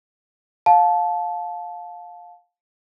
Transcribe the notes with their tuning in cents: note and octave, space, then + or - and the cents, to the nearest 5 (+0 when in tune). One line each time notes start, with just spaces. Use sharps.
F5 +20 A5 -15